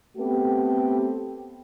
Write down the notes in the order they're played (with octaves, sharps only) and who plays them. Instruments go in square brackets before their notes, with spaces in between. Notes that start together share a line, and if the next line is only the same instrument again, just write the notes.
[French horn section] A3 B3 C4 G4